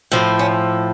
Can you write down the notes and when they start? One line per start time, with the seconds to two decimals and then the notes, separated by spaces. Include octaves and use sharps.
0.12 A2 F3
0.39 C#4